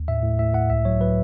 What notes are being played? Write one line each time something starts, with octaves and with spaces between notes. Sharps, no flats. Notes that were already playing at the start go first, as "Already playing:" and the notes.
Already playing: D#2
A2 E5
A2
A2 E5
A2 F#5
C#2 E5
F#3 C#5
F#3 B4